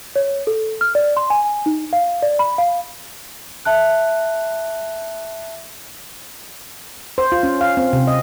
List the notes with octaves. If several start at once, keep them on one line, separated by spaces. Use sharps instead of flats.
C#5
A4
F6
D5
C6
G#5
D#4
F5
D5
B5
F5
E5 A5 F#6
C5
F4
C#4
F5
C4
C3
D#5